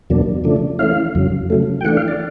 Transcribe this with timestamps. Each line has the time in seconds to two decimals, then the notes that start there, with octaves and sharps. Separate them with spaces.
0.10 E2 B2 F#3 A#3 D4
0.44 C#3 F3 A3 D4
0.79 E3 A3 C#4 E4 F5
1.15 F2 C#3 F#3
1.50 C#3 F#3 A3
1.81 G5
1.85 E3 A3 D4 F#5
1.97 F5
2.08 D5